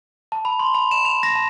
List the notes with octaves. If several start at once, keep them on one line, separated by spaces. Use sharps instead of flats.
A5
B5
C6
B5
E7
F7
A#6
A5